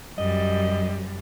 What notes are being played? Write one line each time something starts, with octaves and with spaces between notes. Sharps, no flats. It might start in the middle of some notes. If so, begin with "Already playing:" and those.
F#2 G3 D#5